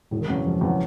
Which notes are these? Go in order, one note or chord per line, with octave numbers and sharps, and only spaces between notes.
E1 A2
D#3
E2 C#3 F#3
F3
E1
E2 C#3 F#3